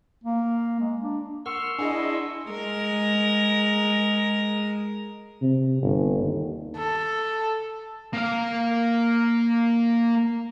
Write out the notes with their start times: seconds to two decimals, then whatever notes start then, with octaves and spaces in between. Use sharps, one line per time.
0.24 A#3
0.80 G#3
1.01 D4
1.46 A#4 F#5 C6 C#6 E6 F6 C#7
1.79 D4 E4 G#4 D#5 F#5 G#5
2.49 G#3 A#4
5.42 C3
5.82 G1
6.19 D#2
6.77 A4
8.14 A#3 F5